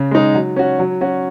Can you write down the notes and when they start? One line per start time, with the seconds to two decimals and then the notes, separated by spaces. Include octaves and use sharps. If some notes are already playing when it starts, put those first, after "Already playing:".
Already playing: C#3
0.11 G#3 D#4
0.35 F#3
0.56 C#4 F#4
0.79 F#3
1.01 C#4 F#4